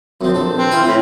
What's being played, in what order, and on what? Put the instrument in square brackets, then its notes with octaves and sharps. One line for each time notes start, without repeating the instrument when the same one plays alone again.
[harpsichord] F#2 F3 [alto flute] C4
[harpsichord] A#1 A4
[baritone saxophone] C4 [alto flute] B4
[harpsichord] E4 G5 G#5 [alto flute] F4
[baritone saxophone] A2 [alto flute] C#5